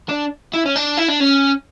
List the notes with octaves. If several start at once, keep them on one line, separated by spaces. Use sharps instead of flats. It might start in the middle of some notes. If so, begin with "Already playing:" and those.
D4
E4
C#4
D4
E4
D4
C#4